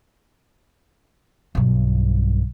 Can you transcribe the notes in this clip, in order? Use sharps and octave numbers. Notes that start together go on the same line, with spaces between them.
B1 G2